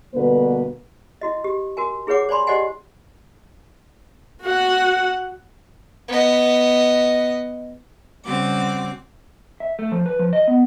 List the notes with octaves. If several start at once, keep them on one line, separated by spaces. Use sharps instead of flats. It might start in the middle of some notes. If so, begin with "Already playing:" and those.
G2 B2 D3 A#3 B3 B4
E4 F#4 D#5
G4
F#4 A#4 G#5
E4 G#4 B4 C#5 F#5 D6
C5 D5 G#5 B5 C6
G4 C5 D5 D#5 F#5 G#5
F#4 F#5
B3 D#5
C#3 G3 C4 F#4 D6
E5
A3
F3
B4
F3
D#5
B3